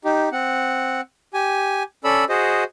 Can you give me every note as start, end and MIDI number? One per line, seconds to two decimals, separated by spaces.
0.05 0.29 63
0.05 0.29 67
0.32 1.01 60
0.32 1.01 78
1.34 1.83 67
1.34 1.83 80
2.04 2.25 61
2.04 2.25 69
2.04 2.25 74
2.04 2.25 83
2.04 2.25 88
2.29 2.64 66
2.29 2.64 68
2.29 2.64 72
2.29 2.64 75